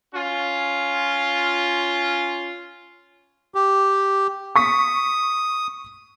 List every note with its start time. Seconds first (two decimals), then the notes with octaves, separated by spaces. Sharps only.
0.14 C#4 F4
3.55 G4
4.56 C#6 D#6 B6